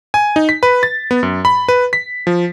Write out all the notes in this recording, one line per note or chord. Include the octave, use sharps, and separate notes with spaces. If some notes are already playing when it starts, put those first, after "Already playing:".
G#5
D#4
B6
B4
A6
B3
F#2
B5
B4
B6
F3